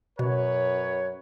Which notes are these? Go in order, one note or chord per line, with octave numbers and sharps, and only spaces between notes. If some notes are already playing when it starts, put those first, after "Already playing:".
F#2 B2 B4 C#5